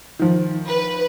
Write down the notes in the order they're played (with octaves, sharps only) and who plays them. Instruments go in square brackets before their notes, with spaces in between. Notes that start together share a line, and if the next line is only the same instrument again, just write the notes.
[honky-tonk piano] D#3 F3
[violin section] B4